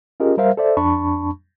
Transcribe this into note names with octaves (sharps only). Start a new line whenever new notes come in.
C#4 F4 G4 G#4 A#4 D#5
G3 A#4 C5 E5 F5
A4 C5 D5 E5
F2 D4 A5 B5 C#6